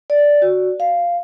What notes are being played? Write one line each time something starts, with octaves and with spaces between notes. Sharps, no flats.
D5
F#4
F5